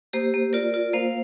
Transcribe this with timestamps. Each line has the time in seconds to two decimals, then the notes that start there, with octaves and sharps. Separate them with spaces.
0.13 A#3 G4 C5
0.34 A#3
0.53 F4 A#4 D5
0.74 F4
0.93 A#3 C5 F5